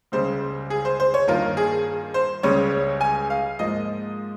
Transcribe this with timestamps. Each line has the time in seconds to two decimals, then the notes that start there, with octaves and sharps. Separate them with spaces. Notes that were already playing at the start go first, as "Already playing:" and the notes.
0.12 C#2 C#3 G3 C5
0.70 G#4
0.85 C5
1.00 C5
1.14 C#5
1.27 G2 D#3 A#3 F4 A#4
1.57 G#4
2.14 C5
2.43 C#2 C#3 G3 C#4 C#5
3.01 G#5
3.30 F5
3.59 G#2 F3 A#3 F4 D#5